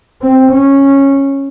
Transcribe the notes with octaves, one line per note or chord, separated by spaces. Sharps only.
C4
C#4